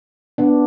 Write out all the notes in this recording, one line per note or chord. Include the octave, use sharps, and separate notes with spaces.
B3 D4